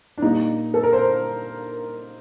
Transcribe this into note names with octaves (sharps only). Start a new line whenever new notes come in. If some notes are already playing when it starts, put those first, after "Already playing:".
D4
A#2 G3 D#4
A4
A#4
C5